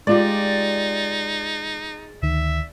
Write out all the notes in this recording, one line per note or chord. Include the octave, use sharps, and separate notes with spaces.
G#3 D#4 F4 G4 D5
D2 D#3 E5